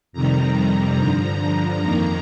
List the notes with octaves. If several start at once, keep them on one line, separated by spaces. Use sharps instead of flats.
F2 C3 D#3 G3 A#5
G2 D3 F3 A#5
F2 D#3 A#3 A#5